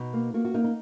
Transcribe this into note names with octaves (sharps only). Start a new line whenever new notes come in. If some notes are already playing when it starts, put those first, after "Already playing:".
Already playing: B2 D#4
A#3
A#3 F#4
F#4
A#3 D#4
D#4